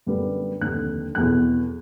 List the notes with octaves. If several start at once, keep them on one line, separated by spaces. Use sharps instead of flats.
F#2 D3 G3 B3
F1 D#2 D3 F#6
F1 E2 B2 F#6